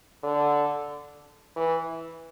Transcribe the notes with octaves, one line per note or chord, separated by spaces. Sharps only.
D3
E3